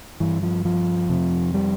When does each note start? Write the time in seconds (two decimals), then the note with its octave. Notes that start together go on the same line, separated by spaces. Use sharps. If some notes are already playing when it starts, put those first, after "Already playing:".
0.20 G2 E3
0.43 F3
0.65 F3
1.09 F2 C3
1.54 G3